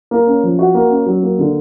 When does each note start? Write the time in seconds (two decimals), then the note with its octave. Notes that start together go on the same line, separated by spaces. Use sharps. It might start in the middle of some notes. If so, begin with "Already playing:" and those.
0.11 A#3
0.27 C#4
0.44 F3
0.59 F#4
0.75 A#3
0.90 C#4
1.06 F#3
1.23 A#3
1.39 D3